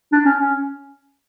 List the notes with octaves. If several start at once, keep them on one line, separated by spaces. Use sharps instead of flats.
D4
C#4
C#4